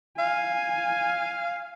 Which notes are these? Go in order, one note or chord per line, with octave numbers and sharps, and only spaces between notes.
F5 G#5